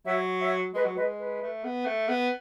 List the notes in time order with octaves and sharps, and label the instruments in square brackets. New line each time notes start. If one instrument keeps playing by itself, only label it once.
[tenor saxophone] F#3 [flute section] C#5 E5
[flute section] C#5 E5
[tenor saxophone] G#3 [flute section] B4 D#5
[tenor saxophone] F#3
[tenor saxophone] G#3 [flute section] B4 D#5
[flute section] B4
[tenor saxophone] A3
B3
A3
[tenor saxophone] B3 [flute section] B4